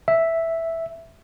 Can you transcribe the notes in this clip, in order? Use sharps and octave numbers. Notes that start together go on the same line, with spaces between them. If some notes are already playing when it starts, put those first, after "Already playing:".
E5